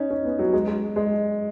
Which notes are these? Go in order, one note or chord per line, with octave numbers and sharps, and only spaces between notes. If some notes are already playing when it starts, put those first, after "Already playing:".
Already playing: C#4 D#4
C#4
B3
F#3
G#3
G#3
G#3